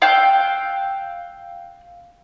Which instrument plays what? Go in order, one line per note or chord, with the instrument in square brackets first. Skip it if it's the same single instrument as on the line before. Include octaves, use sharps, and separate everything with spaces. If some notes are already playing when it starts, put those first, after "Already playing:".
[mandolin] F5 G5 E6 F#6